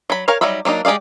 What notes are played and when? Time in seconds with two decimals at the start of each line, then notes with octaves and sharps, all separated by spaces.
0.10 F#3 B5
0.28 A#4 C#5 F5 G#5
0.41 F#3 G3 D#4 E5 B5
0.65 F#3 A#3 D4 D#4
0.85 G#3 G4 G#4 D5 F5